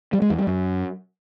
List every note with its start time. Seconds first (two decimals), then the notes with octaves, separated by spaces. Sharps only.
0.13 G3
0.22 G#3
0.30 E2
0.38 G3
0.47 F#2